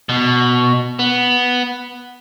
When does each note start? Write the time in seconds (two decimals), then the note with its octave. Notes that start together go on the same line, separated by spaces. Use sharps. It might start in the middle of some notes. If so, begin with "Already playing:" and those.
0.09 B2
0.99 B3